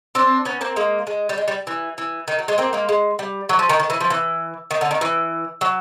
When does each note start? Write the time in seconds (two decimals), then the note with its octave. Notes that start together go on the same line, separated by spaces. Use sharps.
0.15 C4 D4
0.45 B3 C#4
0.61 A#3 C4
0.76 G#3 A#3
1.07 G#3
1.29 G3
1.38 G#3
1.48 G3
1.67 E3
1.98 E3
2.28 D#3
2.39 F#3
2.48 G#3
2.58 A#3 C4
2.73 G#3 A#3
2.89 G#3
3.19 G3
3.49 F#3
3.59 F3
3.69 D#3
3.79 D#3
3.90 E3
4.01 F3
4.10 E3
4.71 D#3
4.81 D3
4.91 D#3
5.01 E3
5.61 F#3